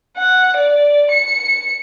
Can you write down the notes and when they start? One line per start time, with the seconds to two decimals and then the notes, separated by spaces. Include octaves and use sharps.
0.18 F#5
0.57 D5
1.12 C#7